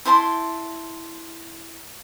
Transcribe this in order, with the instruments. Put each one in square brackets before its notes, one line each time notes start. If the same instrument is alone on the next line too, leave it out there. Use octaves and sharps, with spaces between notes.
[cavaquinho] E4 C5 A5 C6